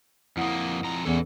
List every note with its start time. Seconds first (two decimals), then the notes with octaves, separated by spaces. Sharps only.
0.37 F2 A#3 E4 F#5 D#6
0.84 F2 A#5
1.05 E2 E3 C#4 A4